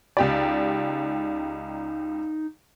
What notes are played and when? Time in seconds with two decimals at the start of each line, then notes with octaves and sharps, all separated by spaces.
0.17 C#2 D#4 G4 D5